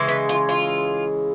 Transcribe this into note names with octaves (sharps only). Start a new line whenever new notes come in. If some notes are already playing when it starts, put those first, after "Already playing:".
Already playing: C#3 E3 G#3
B4
F4
F4